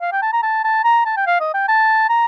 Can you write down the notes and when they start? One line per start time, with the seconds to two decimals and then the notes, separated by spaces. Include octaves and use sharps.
0.01 F5
0.12 G5
0.22 A5
0.33 A#5
0.43 A5
0.64 A5
0.84 A#5
1.05 A5
1.17 G5
1.27 F5
1.41 D#5
1.54 G5
1.68 A5
2.10 A#5